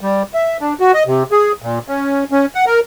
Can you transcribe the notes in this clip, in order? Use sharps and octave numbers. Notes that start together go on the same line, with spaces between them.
G3
E5
D4
F#4
D#5
C3
G#4
A#2
C#4
C#4
F#5
A#4